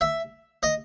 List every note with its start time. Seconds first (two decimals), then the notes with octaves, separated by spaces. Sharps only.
0.01 E5
0.63 D#5